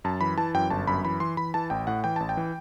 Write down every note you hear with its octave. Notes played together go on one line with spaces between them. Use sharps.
F#2 A5
E3 B5
E3 A5
F#2 G5
G1 A5
F#2 B5
E3 B5
E3 C6
E3 B5
E3 A5
A1 G5
A2 F#5
E3 G5
A1 A5
G5
E3